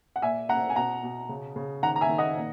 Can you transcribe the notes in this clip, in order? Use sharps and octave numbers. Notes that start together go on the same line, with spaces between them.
F#5
A#2 E5 G#5
A#3 F#5 A#5
G#5
B2 F#5 A#5
B2
C#3
C#3
D#3 F#5 A#5
A#5
E5 G#5
D#3
D#5 F#5
A#2